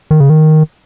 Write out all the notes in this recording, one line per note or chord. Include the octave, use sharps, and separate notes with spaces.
D#3
C#3
D#3